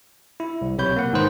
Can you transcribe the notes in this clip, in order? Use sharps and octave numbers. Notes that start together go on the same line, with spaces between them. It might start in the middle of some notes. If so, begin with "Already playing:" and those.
E4
C2
B1 C3 C#5 B5 G6
A#3 F#5
G#2 D#3 B4 C5